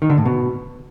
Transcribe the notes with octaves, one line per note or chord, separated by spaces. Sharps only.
D#3
D3
A2
B2